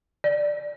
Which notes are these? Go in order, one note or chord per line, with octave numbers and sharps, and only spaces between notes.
D5